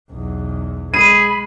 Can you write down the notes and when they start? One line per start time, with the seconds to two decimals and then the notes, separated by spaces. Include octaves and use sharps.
0.11 B1 E2
0.94 G#3 G#4 B5 D#7